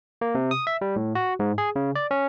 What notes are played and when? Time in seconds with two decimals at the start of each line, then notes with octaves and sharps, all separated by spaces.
0.21 A#3
0.35 C3
0.51 D#6
0.67 E5
0.81 G3
0.96 A2
1.15 F#4
1.40 G#2
1.58 G#4
1.76 C#3
1.95 D5
2.11 C#4